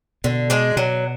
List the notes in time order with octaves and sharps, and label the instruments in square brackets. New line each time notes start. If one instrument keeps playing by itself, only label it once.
[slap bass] B2 [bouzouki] D3
[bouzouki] G#3 D4
[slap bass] B2 [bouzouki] F#3